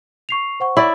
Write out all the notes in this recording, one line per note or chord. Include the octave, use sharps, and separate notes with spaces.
C#6 C7 F7
C5 F#5 C#6
E4 D5